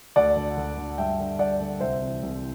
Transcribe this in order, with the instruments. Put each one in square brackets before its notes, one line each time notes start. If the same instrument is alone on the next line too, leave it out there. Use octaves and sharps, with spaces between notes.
[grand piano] D2 D5 F#5
D3
D2
D3
G2 E5 G5
D3
G2 D5 F#5
D3
C2 C5 E5
C3 E3
C2